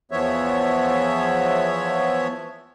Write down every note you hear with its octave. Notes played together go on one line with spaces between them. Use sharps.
E2 E3 F3 B3 C#5 E5